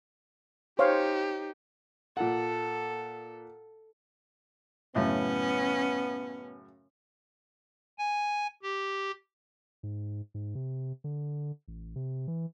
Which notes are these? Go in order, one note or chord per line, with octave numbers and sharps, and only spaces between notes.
D#4 G4 C5 C#5 F5
A#2 A4 F#5
F#2 A2 C#3 B3 C#4
G#5
G4
G#2
G#2
C3
D3
A1
C3
E3